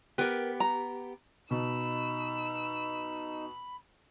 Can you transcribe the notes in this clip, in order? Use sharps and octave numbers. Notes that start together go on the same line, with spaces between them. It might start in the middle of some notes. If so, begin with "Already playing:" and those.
B3 G4 A#4 B4
A#5
B2 D#4 B5 E6